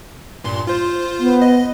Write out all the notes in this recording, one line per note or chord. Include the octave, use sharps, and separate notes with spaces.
G2 A#2 C6
F4 C5
B3
D#5